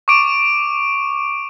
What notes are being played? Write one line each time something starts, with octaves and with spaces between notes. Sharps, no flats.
C#6 D6 D7